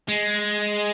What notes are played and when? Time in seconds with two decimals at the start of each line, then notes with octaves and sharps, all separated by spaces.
0.08 G#3